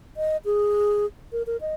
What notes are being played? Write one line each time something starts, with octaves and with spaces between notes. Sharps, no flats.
D#5
G#4
A#4
A#4
D#5